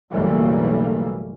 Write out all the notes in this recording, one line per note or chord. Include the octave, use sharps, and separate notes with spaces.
F#1 B1 E3 G3 A3 A#3